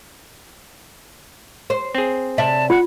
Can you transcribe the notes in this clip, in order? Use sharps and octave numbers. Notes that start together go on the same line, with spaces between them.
C5
C4 G#4
C3 D5 E5 A5
F4 F#5